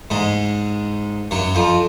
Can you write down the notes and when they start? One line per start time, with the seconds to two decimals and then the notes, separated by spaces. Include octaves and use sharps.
0.10 G#2 G#3
1.31 F#2 F#3
1.55 F2 F3